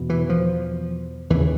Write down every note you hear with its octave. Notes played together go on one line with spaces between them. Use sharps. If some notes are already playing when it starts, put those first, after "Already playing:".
Already playing: E2 B2
E3
F3
D#2 C#3 E3